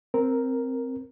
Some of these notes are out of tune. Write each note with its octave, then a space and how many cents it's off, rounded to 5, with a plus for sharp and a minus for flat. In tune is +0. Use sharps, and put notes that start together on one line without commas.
C4 +0 A#4 +0